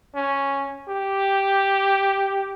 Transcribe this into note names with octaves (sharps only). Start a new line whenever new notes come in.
C#4
G4